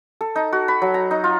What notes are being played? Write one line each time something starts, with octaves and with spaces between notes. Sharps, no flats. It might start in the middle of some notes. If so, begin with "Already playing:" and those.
A4
D#4
F#4
B5
F#3
A#5
D#4
F4